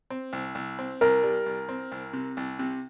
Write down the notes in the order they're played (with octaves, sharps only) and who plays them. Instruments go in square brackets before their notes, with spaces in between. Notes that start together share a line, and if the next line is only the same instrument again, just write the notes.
[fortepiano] C4
C2
C2
C4
[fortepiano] C2 [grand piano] A#4
[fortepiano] G3
C2
C4
C2
C3
C2
C3